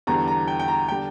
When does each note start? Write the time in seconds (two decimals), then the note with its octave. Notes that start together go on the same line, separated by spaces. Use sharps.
0.07 E2 D3 G3 A#5
0.28 A#5
0.47 G5
0.59 G5
0.68 A#5
0.88 D3 G3 G5